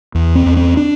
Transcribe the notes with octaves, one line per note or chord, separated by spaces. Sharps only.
E2
C4
E2
C4
D4